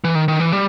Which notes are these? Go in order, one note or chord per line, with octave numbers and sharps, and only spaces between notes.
E3
D#3
D#3
E3
G3